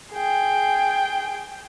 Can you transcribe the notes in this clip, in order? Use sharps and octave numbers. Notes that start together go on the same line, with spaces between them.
G#4 G5